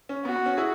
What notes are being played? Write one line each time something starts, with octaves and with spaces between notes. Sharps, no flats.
C#4
B3 F#4
B3
C#4
E4 G#4